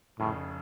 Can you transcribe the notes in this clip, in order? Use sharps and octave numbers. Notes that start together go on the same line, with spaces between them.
F1 F2 A2 C#3